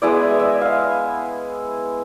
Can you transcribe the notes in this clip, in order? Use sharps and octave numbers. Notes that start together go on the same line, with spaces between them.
G#3 B3 E4 D5
E5
E5
D#5
E5 F5